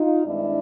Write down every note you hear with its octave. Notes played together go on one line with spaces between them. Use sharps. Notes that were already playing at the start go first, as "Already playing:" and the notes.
Already playing: D#4 F4
G2 D#3 G#3 C4 D4 E4